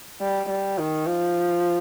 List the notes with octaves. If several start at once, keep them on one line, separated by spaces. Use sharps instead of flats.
G3
G3
D#3
F3